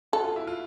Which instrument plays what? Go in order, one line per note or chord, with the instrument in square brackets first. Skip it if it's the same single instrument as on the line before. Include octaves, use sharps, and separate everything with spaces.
[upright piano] F#4 [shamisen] A4
[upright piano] F4
E4
F4